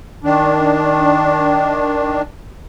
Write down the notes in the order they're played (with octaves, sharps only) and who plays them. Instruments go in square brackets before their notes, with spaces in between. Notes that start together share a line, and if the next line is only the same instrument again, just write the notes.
[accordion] D#3 D4